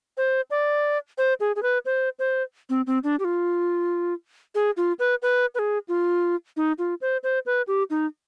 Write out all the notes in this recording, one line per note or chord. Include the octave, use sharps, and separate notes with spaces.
C5
D5
C5
G#4
G#4
B4
C5
C5
C4
C4
D4
G4
F4
G#4
F4
B4
B4
B4
G#4
F4
D#4
F4
C5
C5
B4
G4
D#4